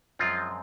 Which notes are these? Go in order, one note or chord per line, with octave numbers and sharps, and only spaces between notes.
F#2 F3 G#3 C4 F4